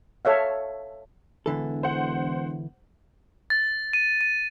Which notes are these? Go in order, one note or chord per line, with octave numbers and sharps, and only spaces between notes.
A4 C#5 E5 F5
E1 D3 E3 A4
C5 F#5
A6
D#7
D#7